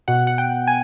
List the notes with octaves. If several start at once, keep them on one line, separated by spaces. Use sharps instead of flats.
B2 F#5
F#5
G5
G#5